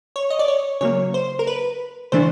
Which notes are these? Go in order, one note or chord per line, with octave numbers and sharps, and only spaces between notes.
C#5
D#5
D5
C#5
C#3 F#3 A#3 C#5
C5
A#4
B4
C#3 E3 A3 D4 C5